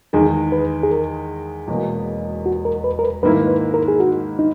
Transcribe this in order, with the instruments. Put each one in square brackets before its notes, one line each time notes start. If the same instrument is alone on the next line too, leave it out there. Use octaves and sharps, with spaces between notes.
[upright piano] E2 D#3 G#3 [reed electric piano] G#4
[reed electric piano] B4
G#4
A#4
[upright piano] E1 E2 B2 A#3
[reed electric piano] F#4
A#4
B4
A#4
B4
[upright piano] G#2 D#3 A#3 E4 [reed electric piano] B4
[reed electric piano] B4
A#4
G#4
F#4
D#4